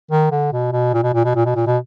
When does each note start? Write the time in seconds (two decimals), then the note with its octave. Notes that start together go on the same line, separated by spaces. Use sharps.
0.11 D#3
0.32 D3
0.53 B2
0.73 B2
0.94 A#2
1.03 B2
1.14 A#2
1.25 B2
1.36 A#2
1.46 B2
1.56 A#2
1.67 B2